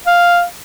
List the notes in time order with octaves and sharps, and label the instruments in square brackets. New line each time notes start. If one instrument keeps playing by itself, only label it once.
[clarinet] F5